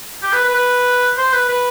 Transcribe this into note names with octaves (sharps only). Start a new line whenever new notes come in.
G4
B4
B4
B4
C5
B4
B4